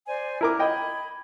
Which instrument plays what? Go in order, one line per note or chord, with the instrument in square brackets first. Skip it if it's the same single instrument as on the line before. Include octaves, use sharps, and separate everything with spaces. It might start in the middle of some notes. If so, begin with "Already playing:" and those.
[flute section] C5 D5 G#5
[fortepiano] E4 A#4 D6
[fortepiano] D#5 G5 [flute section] B5 G#6